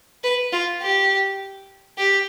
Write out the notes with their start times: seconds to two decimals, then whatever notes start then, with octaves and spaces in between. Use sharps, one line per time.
0.24 B4
0.53 F4
0.82 G4
1.98 G4